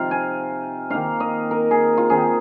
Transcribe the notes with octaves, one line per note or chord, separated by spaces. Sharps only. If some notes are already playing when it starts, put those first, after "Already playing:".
Already playing: C3 F3 C4 D#4 F4 F5
G#5
D#3 A#3 D#4 F5
D#5
A#4
G#4
F4
D#3 C4 D#4 G#4